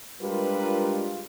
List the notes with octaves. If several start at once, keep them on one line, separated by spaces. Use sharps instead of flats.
G3 G#3 D4 F4 A#4 B4